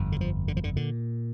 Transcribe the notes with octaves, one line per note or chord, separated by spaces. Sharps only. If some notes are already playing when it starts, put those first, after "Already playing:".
Already playing: G1 F2
D3
F3
D3
F3
D3
A#2 D3